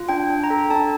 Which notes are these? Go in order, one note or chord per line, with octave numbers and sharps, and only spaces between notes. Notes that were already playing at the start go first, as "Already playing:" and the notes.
Already playing: F4
D4 G5
D4
A#5
A4
D4 A5